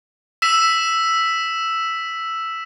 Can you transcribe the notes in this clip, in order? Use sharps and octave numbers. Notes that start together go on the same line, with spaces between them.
E6 B6 E7